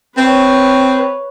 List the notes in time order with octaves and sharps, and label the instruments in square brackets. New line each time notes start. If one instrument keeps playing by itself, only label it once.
[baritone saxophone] C4 [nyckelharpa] B4 C#5